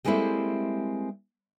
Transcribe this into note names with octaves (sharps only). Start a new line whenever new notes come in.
G3 G#3 A#3 C4 E4 A4